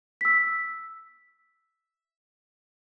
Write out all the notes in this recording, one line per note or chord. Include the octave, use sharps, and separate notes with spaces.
E6 B6